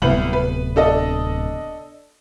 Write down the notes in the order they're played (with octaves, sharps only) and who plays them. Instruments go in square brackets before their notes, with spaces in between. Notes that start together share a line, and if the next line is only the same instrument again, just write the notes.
[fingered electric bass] D1 C3 B3 [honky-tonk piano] C2 B4 F#7
[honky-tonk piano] B4
D4 A4 D#5